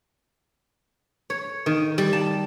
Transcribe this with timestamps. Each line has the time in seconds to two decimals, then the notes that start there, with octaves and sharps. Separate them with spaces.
1.30 C#5
1.66 D#3
1.98 G3
2.13 A5